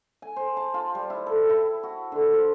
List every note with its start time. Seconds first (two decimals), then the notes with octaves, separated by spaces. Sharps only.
0.22 G#5
0.36 C5
0.57 A5
0.74 F4
0.95 G3
1.10 E4
1.26 A4
1.49 E4
1.83 F#4
2.12 D3
2.33 C5